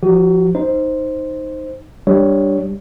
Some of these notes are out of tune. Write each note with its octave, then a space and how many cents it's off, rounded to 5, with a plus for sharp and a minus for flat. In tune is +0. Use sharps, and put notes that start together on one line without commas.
F3 +0 F#4 +35
D#4 +0 C5 +0
G3 +0 D4 +0 C#5 +0